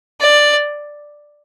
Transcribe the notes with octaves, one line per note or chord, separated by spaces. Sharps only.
D5